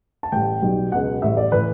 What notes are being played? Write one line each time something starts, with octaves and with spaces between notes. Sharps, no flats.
A5
A1 A2 G3 G5
B1 B2 G3
C#2 B2 F#3 F#5
A1 A2 G3 E5
D5
A2 E3 B4